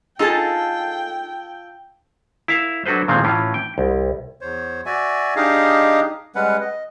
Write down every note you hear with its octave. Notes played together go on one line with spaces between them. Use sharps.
D#4 F4 G#4 A4 G5 A5 E6 G#6
E4 A#4 E5 F5
F#3 D4 F#4 A4 B4 C5
A#2 D#3 F3 G#3 A3 C4
A2 E3 C#4 F4
G5
C2
E2 C5 C#5
F#4 D5 E5 G#5
D4 D#4 G4 G#4 D#5 F5
G3 G#3 C#4 B4 F#5
D#5